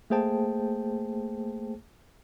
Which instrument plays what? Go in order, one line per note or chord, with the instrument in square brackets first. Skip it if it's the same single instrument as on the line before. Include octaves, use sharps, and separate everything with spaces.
[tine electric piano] A3 A#3 G#4 C5 G5 A5